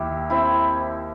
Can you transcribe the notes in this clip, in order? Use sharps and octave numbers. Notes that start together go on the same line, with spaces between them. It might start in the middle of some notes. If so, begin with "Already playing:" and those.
Already playing: D#2 E4 G4
C4 E4